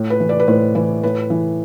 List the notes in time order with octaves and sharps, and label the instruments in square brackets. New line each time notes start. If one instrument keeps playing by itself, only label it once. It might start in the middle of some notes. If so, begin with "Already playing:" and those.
Already playing: [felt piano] A2
B4
E3
D5
B4
A2 C5
E3 B4
A2 B4
E3